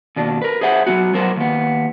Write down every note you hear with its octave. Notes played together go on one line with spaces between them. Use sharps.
D#2 B2 D4
A#4 B4
G#4 C5 E5 F#5
F#3 B3 F#4
F#3 B3 A#4 C5
D#2 B3